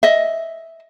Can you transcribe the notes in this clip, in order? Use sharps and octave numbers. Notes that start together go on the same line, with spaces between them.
D#5 E5